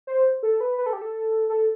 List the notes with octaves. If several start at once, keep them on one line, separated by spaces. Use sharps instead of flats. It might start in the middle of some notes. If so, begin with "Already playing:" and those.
C5
A4
B4
B4
A4
G4
A4
A4